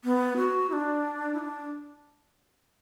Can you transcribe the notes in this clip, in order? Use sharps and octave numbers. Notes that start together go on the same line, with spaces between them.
B3
F#4
E4
D4
E4
D4